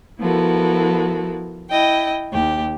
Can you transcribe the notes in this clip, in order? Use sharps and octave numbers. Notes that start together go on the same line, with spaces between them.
F3 B3 E4 F#4 A4 A#4
E4 D#5 G5
D#2 G4